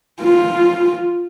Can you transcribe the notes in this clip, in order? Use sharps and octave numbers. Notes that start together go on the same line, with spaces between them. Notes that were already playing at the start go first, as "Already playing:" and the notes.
F4